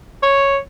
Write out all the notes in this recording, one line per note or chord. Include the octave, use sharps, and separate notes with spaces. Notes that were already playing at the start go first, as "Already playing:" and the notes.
C#5